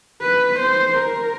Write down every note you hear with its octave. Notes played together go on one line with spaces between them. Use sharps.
B4
C5
A#4